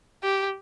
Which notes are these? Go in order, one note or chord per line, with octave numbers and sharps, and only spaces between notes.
G4